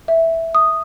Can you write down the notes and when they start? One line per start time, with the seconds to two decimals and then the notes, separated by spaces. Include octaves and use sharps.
0.08 E5
0.55 D#6